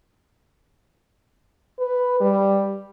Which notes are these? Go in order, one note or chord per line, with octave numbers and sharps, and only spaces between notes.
B4
G3